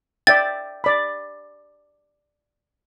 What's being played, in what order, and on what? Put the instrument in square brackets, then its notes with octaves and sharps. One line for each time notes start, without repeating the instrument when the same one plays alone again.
[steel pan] D5 E5 G5 [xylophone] A6
[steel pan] D5 B5